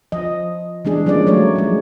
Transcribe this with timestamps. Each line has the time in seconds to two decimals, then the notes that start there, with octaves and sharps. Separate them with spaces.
0.12 F3 D#5
0.85 E3 G#3 D4 G#4
1.06 F3 G3 G#3 A#3 C#4 D5
1.27 F#3 A3 C#5 D5
1.55 F3 G#3